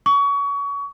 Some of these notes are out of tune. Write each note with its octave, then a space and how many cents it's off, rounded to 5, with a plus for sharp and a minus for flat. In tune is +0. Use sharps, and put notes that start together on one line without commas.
C#6 +30